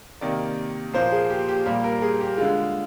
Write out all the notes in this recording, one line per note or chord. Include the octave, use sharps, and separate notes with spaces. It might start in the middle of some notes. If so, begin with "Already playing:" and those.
C3 D#3 A#3 D5
A#2 F3 A#3 C5
G#4
G4
G4
A#2 G3 A#3 G4
A#4
G#4
G4
D3 G#3 F4